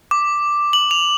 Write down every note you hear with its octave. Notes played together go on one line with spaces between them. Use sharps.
D6
F#7
F7